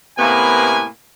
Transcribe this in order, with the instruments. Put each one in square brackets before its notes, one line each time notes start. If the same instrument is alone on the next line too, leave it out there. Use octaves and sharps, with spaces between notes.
[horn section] A2 C3 A#3 B3 B4 G#5